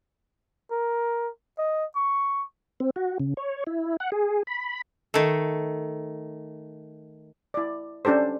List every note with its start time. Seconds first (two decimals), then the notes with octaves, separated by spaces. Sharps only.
0.71 A#4
1.58 D#5
1.96 C#6
2.80 C4
2.96 F#4
3.20 C#3
3.37 C#5
3.67 E4
4.00 F#5
4.12 G#4
4.47 B5
5.14 D#3 A3
7.54 E4 D5
8.05 C#4 D4 G4 A4 C5